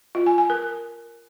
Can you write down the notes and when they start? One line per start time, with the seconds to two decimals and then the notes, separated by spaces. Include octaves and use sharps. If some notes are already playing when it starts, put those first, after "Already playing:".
0.15 F4
0.26 G#5
0.38 G#5
0.50 A#4